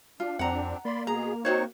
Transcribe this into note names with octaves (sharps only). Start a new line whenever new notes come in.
D4 F4
F2 C4 D4 F#5 A#5
A#3 D5 B5 C6
B2 G#4 A#5
C4 D#4 F#4 C5 C#5 C#6